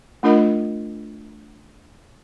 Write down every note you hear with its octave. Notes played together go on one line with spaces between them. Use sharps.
A3 D4 F4 A#4 D#5 B5